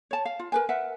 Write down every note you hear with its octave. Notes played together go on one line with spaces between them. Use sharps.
C#5 A5
F5
F4
A#4 B4 G#5
A#4 B4 E5 F#5